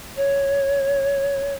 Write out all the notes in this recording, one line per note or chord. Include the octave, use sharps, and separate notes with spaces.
C#5